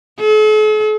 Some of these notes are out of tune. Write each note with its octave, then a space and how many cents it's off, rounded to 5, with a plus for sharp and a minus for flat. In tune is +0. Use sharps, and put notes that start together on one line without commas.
A4 -45